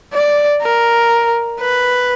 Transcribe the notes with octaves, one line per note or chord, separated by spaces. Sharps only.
D5
A#4
B4